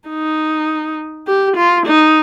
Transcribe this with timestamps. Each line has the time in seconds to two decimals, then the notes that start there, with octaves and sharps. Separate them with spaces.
0.09 D#4
1.27 G4
1.57 F4
1.86 D#4